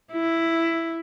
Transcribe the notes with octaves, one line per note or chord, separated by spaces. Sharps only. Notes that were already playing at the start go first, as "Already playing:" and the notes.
E4